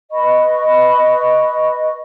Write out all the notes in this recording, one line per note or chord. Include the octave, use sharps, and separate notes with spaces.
B4 D#5 B5 C#6